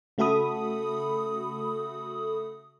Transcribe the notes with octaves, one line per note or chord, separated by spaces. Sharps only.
C#3 A3 F#4 A4 B5 D#6